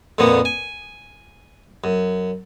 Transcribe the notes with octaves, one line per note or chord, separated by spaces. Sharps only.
F2 A#2 D3 A#3 B3
G#5
F#2